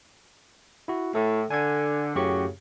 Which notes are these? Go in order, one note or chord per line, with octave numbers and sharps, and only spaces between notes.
E4 F#4
A2 A4
D3 G#5 G#6
F#2 A2 C#3 F#4 G4 C#6